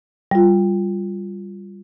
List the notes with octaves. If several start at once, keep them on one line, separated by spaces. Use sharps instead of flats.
G3 F4